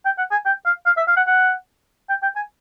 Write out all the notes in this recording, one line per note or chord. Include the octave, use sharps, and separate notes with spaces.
G5
F#5
G#5
G5
F5
F5
E5
F5
F#5
F#5
G5
G5
G#5